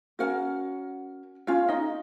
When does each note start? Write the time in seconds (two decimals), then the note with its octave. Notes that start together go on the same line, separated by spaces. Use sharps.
0.19 C#4 F4 F#4 A#4 F#5
1.47 C#4 F4 F5
1.69 D#4 D#5